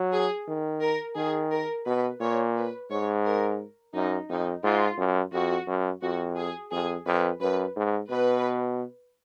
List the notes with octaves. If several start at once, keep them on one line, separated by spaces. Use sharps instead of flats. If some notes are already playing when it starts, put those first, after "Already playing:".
Already playing: F#3
G#4
D#3
A#4
D#3 G#4
A#4
B2 B4
A#2 C#5
B4
G#2 C#5
A#4
F#2 D#4
F2 D#4
G#2 F4
F#2
F2 F#4
F#2
F2 F#4
G#4
F2 G#4
F2 B4
F#2 B4
G#2
B2 B4